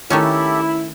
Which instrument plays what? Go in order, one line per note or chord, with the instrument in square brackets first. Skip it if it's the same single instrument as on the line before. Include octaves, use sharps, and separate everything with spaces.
[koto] D#3 A3 C#4 [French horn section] E4 [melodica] G4 A4